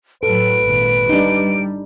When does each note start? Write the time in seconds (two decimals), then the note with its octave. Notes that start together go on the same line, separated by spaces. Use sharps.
0.23 A2 F#3 A4 B4 D7
0.65 G#1 A#2
1.09 G3 D4 D#4